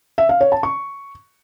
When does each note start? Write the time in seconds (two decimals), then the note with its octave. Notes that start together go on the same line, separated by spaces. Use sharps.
0.18 E5
0.29 F5
0.41 C#5
0.52 A5
0.63 C#6